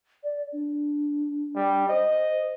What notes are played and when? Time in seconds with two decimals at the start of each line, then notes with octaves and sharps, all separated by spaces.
0.23 D5
0.52 D4
1.56 G3
1.89 C5 D#5